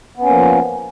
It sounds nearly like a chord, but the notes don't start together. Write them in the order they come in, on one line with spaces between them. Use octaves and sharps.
B3 C#4 A#3 F3